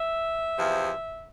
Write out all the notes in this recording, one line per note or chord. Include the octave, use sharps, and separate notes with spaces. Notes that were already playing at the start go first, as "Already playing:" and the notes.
Already playing: E5
E2 C3 F3